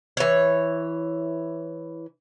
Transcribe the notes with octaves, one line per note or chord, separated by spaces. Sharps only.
E3 C#5